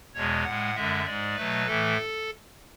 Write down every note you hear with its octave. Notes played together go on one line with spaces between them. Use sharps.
E2 B2 G#3 C#5
A2 G#3 F#5
F#2 D3 G#3 E5
G#2 G#3 D5
B2 F#3 A3 B4
A2 E3 A3 A4